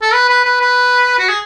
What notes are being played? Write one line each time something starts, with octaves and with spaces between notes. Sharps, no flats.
A4
B4
B4
B4
B4
F#4
G#4